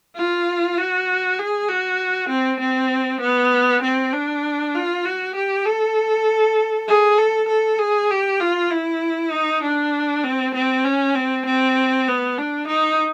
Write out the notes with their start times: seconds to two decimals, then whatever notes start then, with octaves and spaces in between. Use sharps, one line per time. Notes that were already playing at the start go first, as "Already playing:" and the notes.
0.16 F4
0.78 F#4
1.39 G#4
1.69 F#4
2.29 C4
2.60 C4
3.21 B3
3.82 C4
4.13 D4
4.75 F4
5.05 F#4
5.36 G4
5.66 A4
6.88 G#4
7.18 A4
7.48 A4
7.79 G#4
8.11 G4
8.40 F4
8.71 E4
9.32 D#4
9.63 D4
10.24 C4
10.55 C4
10.85 C#4
11.15 C4
11.46 C4
12.08 B3
12.38 D4
12.68 D#4